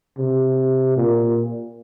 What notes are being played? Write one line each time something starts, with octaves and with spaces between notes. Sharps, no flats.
C3
A#2